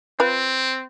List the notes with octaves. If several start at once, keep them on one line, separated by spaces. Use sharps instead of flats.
C4 F4 B4